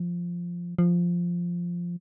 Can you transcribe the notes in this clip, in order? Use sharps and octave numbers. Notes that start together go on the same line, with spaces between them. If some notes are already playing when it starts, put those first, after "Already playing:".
Already playing: F3
F3